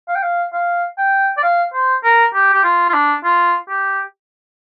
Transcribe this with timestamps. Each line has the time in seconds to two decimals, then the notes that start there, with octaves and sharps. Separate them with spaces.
0.09 F5
0.16 G5
0.23 F5
0.53 F5
0.98 G5
1.37 D5
1.43 F5
1.74 C5
2.04 A#4
2.34 G4
2.53 G4
2.64 F4
2.89 F4
2.94 D4
3.24 F4
3.69 G4